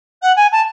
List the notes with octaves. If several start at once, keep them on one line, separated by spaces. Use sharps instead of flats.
F#5
G#5
A5